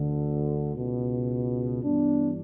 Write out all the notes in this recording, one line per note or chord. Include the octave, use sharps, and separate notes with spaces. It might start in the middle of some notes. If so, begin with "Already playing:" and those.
Already playing: D2 D3
C#2 B2
G2 E3 B3 D4